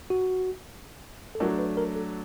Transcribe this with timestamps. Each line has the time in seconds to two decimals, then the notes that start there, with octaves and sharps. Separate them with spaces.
0.10 F#4
1.35 A4
1.40 F#3 A3 D4 A#4
1.59 B4
1.77 A#4
1.96 A4